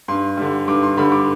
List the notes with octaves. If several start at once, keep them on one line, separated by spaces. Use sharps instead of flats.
G2 C6
D3 G3
G2 D6
C6
D3 G3 B5
D6